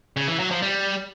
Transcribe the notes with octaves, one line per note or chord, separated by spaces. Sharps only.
C#3
E3
F#3
F3
G3